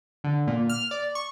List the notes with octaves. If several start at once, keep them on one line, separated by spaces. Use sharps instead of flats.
D3
A#2
F6
D5
C#6